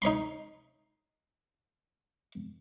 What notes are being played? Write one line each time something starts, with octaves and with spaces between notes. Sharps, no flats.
D#4 C#5 B5 C6